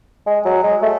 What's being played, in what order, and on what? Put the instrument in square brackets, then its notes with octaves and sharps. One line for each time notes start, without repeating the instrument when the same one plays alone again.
[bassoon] G#3
F#3
G#3
A3